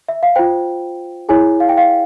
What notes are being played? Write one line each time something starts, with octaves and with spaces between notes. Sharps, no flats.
E5
F5
F4 C5 G5
E4 G#4 C#5 G#5
F5
G5
F5